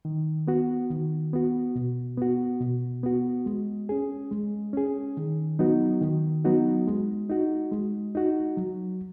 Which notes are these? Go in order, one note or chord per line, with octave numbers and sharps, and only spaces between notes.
D#3
B3 F#4
D#3
B3 F#4
B2
B3 F#4
B2
B3 F#4
G#3
C#4 G#4
G#3
C#4 G#4
D#3
F#3 B3 D#4 F#4
D#3
F#3 B3 D#4 F#4
G#3
D#4 F#4
G#3
D#4 F#4
F#3